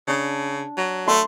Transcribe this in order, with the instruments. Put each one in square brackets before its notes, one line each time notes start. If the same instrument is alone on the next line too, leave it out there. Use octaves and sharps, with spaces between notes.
[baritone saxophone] C#3 [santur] D4
[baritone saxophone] F#3
[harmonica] A3 [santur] C6